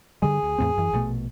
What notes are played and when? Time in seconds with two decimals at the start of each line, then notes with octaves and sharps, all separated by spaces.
0.22 G2 D3 G3 G#4
0.43 D2
0.58 E2 A2 C4
0.77 F#2 E3
0.93 A#1 B2 A3